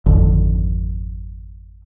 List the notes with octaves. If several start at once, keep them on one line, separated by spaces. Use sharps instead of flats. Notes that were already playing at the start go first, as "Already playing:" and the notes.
G#1 F2 D3